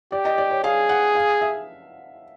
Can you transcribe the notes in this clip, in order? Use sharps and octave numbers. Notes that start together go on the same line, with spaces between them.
G4 D5
D#5
D5
C#5
G#4 F5
F#5
F5
E5